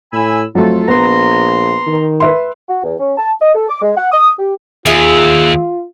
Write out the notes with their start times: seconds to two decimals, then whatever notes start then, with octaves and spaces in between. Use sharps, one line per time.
0.13 A2 G#5 B5 E6
0.55 F2 F#3 A3 F4 A4
0.88 A#1 B3 A#5 C6
1.87 D#3
2.20 B4 E5 C6
2.69 F#4
2.84 E2
3.00 C#4
3.18 A5
3.41 D#5
3.55 A4
3.69 D6
3.82 G#3
3.97 F#5
4.12 D#6
4.39 G4
4.86 D#2 F4 G#4 E5